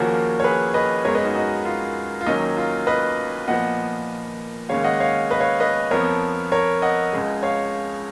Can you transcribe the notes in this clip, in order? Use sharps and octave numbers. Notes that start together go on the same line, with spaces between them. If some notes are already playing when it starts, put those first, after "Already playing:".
Already playing: D#2 C#3 F3 A#3 C#4 F#4 A#4
C#5
G#4 B4
B4 D#5
F#2 C#3 G#3 B3 A#4 C#5
B4 D#5
D#4 F#4
D#4 F#4
F4
F4
D#2 D#3 F#3 C#4 D#4
F4
B4 D#5
A#2 F3 B3 D#5 F#5
D#2 C#3 G#3 C#5 F5
D#5 F#5
C#5 F5
B4 D#5
C#5 F5
B4 D#5
F2 F3 B3 A#4 C#5
A#4 C#5
D#5 F#5
C#2 C#3 G#3
C#5 F5